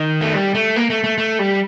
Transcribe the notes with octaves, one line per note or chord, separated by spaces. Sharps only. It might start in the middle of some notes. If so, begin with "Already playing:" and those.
Already playing: D#3
A3
G3
A3
A#3
A3
A3
A3
G3